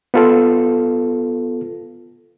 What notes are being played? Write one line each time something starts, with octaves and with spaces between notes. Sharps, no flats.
B3 F4 A4